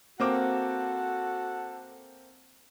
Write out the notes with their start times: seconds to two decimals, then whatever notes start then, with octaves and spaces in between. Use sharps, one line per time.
0.20 A#3 C4 F#4 A4 F#5 D6